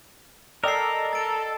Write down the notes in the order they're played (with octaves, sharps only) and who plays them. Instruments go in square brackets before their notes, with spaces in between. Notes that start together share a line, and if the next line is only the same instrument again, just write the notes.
[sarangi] A4 [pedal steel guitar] A#4 [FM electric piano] D5 D#5 G5 [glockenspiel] E6 C7
[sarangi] A4 [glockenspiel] A6 D7